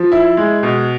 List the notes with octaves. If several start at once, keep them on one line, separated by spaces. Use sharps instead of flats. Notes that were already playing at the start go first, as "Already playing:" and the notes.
Already playing: F3
E4
G#3
B2